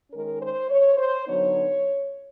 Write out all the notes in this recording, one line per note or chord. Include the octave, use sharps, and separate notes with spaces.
D#3 G#3 C#4 A#4
C5
C#5
C5
D3 F#3 B3 D#4 C#5